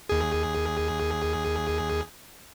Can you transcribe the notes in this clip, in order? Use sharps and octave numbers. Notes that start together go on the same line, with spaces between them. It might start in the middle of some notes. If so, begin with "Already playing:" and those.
D#2 G#4